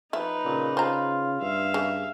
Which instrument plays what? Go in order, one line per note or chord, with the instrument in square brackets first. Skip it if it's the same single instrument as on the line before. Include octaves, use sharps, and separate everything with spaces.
[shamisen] F3 E5 [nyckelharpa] D#4 B4
[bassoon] A#2 [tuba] C#3
[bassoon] F4 [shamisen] C5 A#5
[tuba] G2 [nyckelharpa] E5 F5
[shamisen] C#3